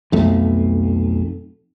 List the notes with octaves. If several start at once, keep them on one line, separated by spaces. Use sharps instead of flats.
B1 F2 A3